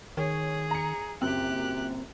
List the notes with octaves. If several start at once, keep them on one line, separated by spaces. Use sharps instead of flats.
D#3 G#4 C#5
A#5 C#7
F#1 F#2 A#2 C4 G4 F#6